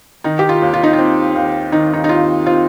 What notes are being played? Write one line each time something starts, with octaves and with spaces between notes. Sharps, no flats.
D#3 D#4
G4
F4
D#2
F4
D#4
F4
C4
D#2
D#3 D#4
D#4
D#4
D#2 F4
C4 F4